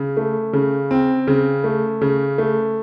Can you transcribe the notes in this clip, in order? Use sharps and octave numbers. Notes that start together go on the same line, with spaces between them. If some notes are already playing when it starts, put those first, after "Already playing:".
Already playing: C#3
A3
C#3
C4
C#3
A3
C#3
A3